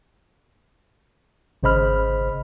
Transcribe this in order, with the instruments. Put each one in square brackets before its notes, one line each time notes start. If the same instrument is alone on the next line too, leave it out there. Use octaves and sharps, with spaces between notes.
[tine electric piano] G#1 C#3 C5 D#5 B5 F6